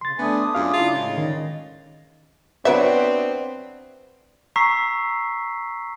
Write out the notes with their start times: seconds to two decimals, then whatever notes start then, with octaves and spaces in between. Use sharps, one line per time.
0.01 C#3 C6 A6
0.19 A3 B3 D4 E5 G#5 D6 D#6
0.55 F#2 D4 F4 G#4 F5
0.73 C#3 D4 E4 F4
0.94 A2 C#3 G#3
1.18 D#3 D5 D#5
2.65 F#3 B3 C4 D4 B4 C#5 E5
4.56 A#5 C#6 E6 B6 C7